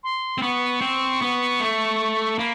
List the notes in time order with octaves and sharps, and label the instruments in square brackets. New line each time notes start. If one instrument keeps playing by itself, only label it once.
[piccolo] C6
[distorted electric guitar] C4
[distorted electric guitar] B3 [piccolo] C#6
[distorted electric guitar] C4
B3
A3
[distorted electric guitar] A#3 [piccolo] B5